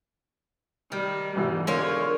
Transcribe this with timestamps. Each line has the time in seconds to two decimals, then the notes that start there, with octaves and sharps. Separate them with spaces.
0.92 D#3 G3
1.36 G#2 B2 E3 G3
1.67 D3 G#3 F4 A#4 C#5